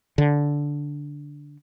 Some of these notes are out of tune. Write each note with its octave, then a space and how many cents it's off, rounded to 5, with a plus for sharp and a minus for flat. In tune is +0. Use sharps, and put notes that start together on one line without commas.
D3 -10